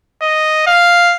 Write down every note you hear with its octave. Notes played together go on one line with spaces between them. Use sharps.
D#5
F5